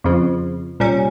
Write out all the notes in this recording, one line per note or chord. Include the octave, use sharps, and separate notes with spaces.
F2 C#3 F3
C2 A#2 G3 C#4